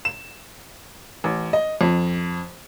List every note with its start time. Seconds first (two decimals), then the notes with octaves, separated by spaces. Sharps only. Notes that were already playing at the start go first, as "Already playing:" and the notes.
0.05 E7
1.24 A1
1.53 D#5
1.81 F2